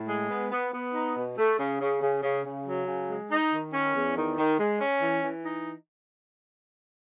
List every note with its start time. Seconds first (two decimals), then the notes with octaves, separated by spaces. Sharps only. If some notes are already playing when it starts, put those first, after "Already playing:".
Already playing: A2
0.08 G#3
0.30 B3
0.51 B3
0.73 B3
0.94 D#4
1.16 B2
1.38 A3
1.59 C#3
1.80 C#3
2.02 C#3
2.23 C#3
2.45 C#3
2.66 F#3
2.87 C#3
3.09 G#3
3.30 D#4
3.52 D#3
3.73 C#4
3.95 E2
4.16 D#3
4.38 D#3
4.59 G#3
4.81 C#4
5.01 E3
5.23 E3
5.45 D#4